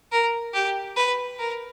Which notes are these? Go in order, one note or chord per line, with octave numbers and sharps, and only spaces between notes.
A#4
G4
B4
A#4